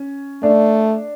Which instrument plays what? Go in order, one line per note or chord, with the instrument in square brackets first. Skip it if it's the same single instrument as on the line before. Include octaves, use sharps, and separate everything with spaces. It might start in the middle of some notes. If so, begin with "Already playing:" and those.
Already playing: [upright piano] C#4
[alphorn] A3 [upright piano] D4